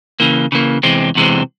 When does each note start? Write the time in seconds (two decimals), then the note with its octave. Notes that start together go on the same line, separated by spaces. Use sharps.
0.20 C#3 E3 A#3
0.52 C#3 E3 A#3
0.83 E2 C3 E3 G#3 C4
1.15 E2 C3 E3 G#3 C4